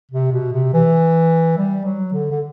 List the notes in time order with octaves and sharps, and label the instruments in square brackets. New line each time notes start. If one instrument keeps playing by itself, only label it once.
[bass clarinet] C3
B2
C3
E3
G3
F#3
D3
D3